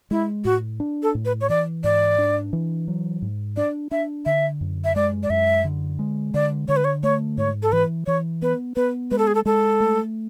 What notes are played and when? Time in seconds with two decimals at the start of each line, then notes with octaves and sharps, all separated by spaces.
0.11 G#3 E4
0.45 A2 F#4
0.80 D4
1.03 A4
1.15 A2
1.25 B4
1.41 C#5
1.49 E3 D5
1.84 G#2 D5
2.18 D4
2.53 E3
2.88 F#3
3.22 G#2
3.57 D4 D5
3.91 D4 E5
4.26 D3 E5
4.61 F#2
4.84 E5
4.96 G#3 D5
5.23 D5
5.30 F#2 E5
5.65 D3
5.99 G#3
6.34 D3 D5
6.68 D3 C#5
6.77 B4
6.84 C#5
7.03 A3 C#5
7.38 G#2 C#5
7.63 A4
7.72 E3 B4
8.06 E3 C#5
8.42 B3 B4
8.76 B3 B4
9.11 G#3 B4
9.18 A4
9.27 G#4
9.35 A4
9.45 G#3 A4
9.80 A3